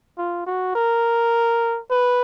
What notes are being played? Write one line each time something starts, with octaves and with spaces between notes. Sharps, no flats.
F4
F#4
A#4
B4